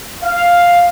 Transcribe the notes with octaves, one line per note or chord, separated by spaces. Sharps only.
F5